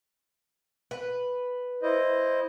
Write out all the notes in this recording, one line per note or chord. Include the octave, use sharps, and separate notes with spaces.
B4
E4 C5 D#5